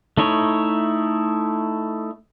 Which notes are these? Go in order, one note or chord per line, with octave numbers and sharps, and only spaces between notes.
A3 D#4 E4 C#5